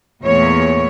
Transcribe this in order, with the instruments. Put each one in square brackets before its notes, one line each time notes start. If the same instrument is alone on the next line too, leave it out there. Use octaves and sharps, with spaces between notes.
[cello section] E2 A#2 A3 C#5